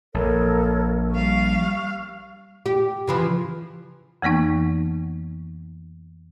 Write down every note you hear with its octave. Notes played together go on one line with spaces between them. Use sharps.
A#1 A4 A#4 C#5
G3 F5 C#6 F6
G4
C#3 E3 F3
F2 E3 A#3 B3 D#4